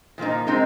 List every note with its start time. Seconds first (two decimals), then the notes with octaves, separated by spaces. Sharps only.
0.18 A#2 F3 A#3 D#4
0.47 G#3 C4 D#4 A#4